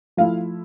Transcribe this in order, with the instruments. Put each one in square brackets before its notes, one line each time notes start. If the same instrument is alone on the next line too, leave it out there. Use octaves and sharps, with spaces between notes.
[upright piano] F3 A3 E4 F5